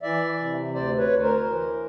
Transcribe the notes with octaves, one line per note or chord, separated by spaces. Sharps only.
E3 D5 E5
C3
D2 C5 D5
B4 C#5
D2
A#4 C5
E3